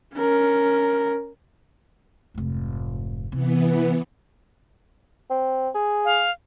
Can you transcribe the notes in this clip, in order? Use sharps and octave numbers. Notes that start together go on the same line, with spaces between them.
C#4 A#4
F1 G#2
C3 E3 B3
C4
G#4
F5